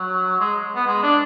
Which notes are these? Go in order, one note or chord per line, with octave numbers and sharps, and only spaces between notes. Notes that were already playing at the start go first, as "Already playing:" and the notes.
Already playing: F#3
G#3
B3
G#3
D4